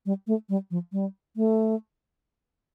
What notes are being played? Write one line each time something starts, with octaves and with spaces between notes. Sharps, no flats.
G3
A3
G3
F3
G3
A3